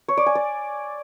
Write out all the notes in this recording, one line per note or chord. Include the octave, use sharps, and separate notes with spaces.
C#5
D5
G#5
D5